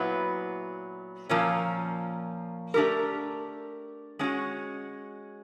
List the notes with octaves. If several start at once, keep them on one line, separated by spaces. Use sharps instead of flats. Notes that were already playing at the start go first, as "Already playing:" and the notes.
Already playing: A#2 F#3 B3 E4
A#2 F3 A#3 C#4
A3 D4 G4 A#4
G#3 C#4 F#4